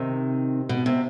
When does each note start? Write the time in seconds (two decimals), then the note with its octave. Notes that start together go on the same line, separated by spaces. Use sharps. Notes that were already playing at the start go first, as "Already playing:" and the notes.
Already playing: C3 D#3
0.69 B2
0.86 C3